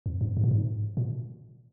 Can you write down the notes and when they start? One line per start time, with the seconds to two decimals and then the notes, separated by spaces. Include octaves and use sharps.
0.06 F2
0.21 G2
0.37 G#2
0.44 A#2
0.51 G#2
0.97 A#2